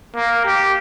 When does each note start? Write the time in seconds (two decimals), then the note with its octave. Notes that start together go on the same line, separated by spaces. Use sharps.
0.15 A#3
0.45 G4